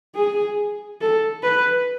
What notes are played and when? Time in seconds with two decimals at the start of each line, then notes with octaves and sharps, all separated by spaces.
0.16 G#4
1.01 A4
1.43 B4